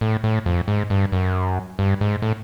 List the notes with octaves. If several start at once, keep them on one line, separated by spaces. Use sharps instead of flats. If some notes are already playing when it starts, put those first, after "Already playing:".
A2
A2
F2
G#2
G2
F#2
G2
G#2
A2